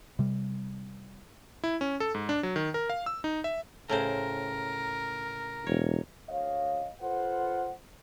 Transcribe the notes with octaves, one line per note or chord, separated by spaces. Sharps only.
C3 G3
E4
C#4
A4
G#2
D4
F#3
D#3
A#4
F5
E6
D#4
E5
A2 C#3 A#4 C5
E1 C#5
D2 C#5 D#5 F5
F4 A4 B4 C5 F#5